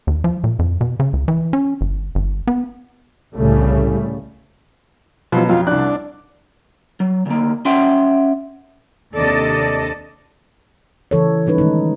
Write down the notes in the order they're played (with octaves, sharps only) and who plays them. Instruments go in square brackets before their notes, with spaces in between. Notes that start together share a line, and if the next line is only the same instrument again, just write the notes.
[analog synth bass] D#2
F3
A#2
F2
B2
C#3
C#2
E3
C#4
G1
G1
B3
[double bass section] C2 A2 C#3 G3 A3
[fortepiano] B2 F#3 [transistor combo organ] F3
[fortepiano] F2 F#3 [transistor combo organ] F4
[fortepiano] C2 F#6 [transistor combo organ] D4
[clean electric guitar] F#3
D2 A#3
C#4 E5 F#5 G5 C6
[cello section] D#2 C3 D4 A4 D5 D#5
[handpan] C#3 E3 A4 C#5
G3 C#4 D#4 B4
D#3 G#3 A3 D#4